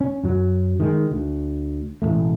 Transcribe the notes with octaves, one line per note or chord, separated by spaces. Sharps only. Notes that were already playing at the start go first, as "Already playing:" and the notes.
C#4
F#2 F#3
D#3 G#3
D2
E1 A1 F2 A3